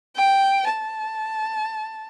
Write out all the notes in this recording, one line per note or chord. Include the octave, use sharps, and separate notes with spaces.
G5
A5